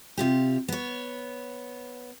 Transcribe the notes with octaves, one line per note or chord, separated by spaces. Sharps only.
C3 F4 G4
B3 C#5